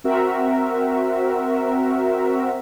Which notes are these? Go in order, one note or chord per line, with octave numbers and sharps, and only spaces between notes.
C4 F#4 A#4 E5